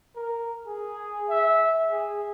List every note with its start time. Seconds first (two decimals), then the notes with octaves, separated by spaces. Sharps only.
0.16 A#4
0.67 G#4
1.29 E5
1.91 G#4